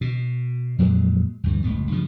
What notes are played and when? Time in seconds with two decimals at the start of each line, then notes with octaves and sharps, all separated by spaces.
0.01 B2
0.79 F2 A#2 F#3 G#3
1.44 D2 G2 E3
1.64 F#1 C#2 A2 B3
1.91 G2 C#3 F3